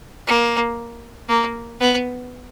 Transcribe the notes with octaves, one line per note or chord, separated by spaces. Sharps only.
A#3
A#3
B3